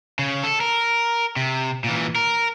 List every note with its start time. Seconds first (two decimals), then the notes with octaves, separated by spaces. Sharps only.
0.19 C#3
0.43 A4
0.60 A#4
1.36 C3
1.84 A#2 E3
2.16 A#4